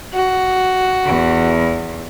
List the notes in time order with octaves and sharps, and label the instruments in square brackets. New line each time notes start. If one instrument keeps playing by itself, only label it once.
[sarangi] F#4
[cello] E2